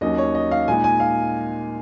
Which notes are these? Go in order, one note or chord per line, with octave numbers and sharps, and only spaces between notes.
D#2 D#3 F#3 C#4 D#5
C#5
D#5
F5
A#2 G#3 D#4 G#5
G#5
F5